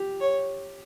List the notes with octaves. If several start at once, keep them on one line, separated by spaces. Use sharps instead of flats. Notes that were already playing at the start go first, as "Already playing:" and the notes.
Already playing: G4
C#5